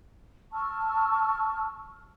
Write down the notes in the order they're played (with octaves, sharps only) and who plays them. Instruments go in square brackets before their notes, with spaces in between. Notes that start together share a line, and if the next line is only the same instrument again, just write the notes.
[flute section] A5 C#6 E6 F6